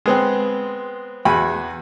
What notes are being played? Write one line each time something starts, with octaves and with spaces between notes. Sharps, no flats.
G#3 B3 C4
E2 F#4 G#5 B5